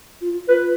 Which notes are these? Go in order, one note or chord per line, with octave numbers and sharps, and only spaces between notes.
F4
F4 B4